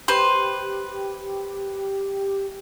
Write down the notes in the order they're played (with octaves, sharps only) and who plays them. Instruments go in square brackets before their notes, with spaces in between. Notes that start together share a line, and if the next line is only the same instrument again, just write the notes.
[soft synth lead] G4 [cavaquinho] B4 C5 C6